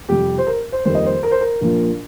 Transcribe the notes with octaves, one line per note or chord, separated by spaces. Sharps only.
F2 C3 G3 G4
C5
A#4
C5
F2 D#3 G3 A#3 C5
D#5
C5
A#4
C5
A#4
A#1 A#2 F3 A#3